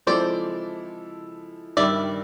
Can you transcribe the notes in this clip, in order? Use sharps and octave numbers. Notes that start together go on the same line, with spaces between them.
F3 G#3 C4 E4 A4 C5 D5
G2 D#3 G3 D5 E5